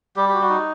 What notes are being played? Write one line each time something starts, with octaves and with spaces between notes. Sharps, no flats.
G3 G4
F#4 G4
F#4
D#4